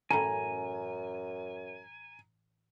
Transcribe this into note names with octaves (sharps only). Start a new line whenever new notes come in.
F#2 A2 E3 C#4 G#5 A#5